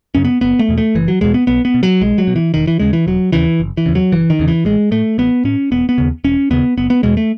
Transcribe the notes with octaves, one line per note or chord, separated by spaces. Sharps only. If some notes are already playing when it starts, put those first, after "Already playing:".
F#2 C#3 C#4
B3
F#1 B3
A3
E2 B2
A3
F#1 E3
F#3
E2 B2 G#3
B3
B1 B3
B3
B2
F#3
B1 G#3
F#3
B2
E3
E1 D#3
E3
D#2 C#3 G#3
E3
E1 F#3
D#2 C#3 E3
F#1
E3
E2 C#3
F#3
F#1 E3
D#3
E2 C#3
E3
A1 G#3
A2 A3
A1 B3
A2 C#4
E1 B3
B3
D#2 C#3
E1 C#4
D#2 C#3 B3
F#1 B3
B3
E2 B2 G#3
A3